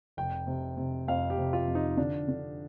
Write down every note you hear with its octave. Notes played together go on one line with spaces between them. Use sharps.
F1 G5
C3
C3
F2 F5
G4
C3
F4
F2
D#4
D3 D4
D3